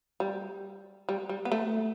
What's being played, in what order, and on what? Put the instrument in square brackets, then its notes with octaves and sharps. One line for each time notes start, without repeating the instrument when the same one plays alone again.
[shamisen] G3
G3
G3
B3
A3